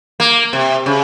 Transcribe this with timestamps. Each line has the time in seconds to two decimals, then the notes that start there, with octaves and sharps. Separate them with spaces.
0.20 A#3
0.53 C3
0.86 C#3